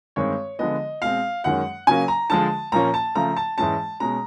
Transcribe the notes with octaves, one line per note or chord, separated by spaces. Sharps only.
G2 D#3 G#3 C4 C#5
D3 F3 G#3 B3 D#5
B2 G#3 C4 F5
F#2 D#3 G#3 C#4 F#5
C#3 F#3 A#3 C#4 G#5
A#5
D3 F3 G#3 A5
A#2 F3 A#3 C#4 A#5
A5
C#3 F3 A3 A#5
A5
G#2 E3 G#3 C#4 A5
B2 G#3 C#4 A#5